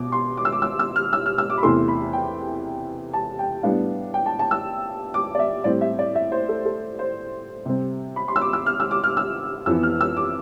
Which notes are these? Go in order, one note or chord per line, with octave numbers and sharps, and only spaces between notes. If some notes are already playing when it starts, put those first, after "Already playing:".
Already playing: B2 D6
C6
D6
E6
D6
E6
E6
F6
E6
F6
E6
D6
B5
E2 C3 E3 A3 C6
B5
G5
A5
G5
A2 G3 B3 D4 F5
G5
A5
A5
E6
D6
D5
E5
A2 G3 C4 D5
E5
D5
E5
C5
A4
A4
C5
C3 G3 C4
B5
C6
E6
D6
E6
F6
E6
D6
F6
E6
F2 E3 B3 E6
F6
E6
D6